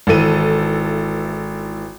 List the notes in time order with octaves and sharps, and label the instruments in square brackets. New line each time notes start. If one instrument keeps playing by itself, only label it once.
[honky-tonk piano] G#1 E3 A4 D#7